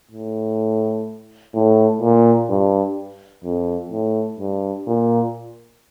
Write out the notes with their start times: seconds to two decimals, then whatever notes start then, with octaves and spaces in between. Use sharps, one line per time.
0.11 A2
1.54 A2
2.01 A#2
2.49 G2
3.44 F2
3.92 A2
4.40 G2
4.87 A#2